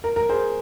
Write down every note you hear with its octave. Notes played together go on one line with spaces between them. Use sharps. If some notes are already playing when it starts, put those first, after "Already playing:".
A#4
A#4
G#4 C5